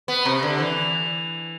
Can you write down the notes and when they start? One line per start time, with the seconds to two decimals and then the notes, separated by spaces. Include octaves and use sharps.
0.08 B3
0.25 C3
0.43 D3
0.59 E3